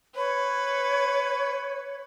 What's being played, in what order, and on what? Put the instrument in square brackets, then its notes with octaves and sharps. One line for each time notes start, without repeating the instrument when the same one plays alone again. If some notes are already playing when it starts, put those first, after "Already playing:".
[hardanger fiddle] B4 [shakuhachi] C#5